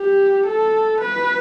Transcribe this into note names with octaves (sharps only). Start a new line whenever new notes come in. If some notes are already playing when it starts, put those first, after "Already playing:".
Already playing: G4
A4
B4